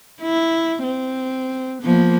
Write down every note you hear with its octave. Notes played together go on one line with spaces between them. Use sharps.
E4
C4
F3 A#3 B3